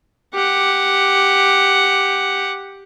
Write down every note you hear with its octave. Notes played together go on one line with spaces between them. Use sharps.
G4 F#5